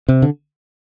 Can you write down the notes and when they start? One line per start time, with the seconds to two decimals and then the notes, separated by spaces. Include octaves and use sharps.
0.08 C3
0.22 D3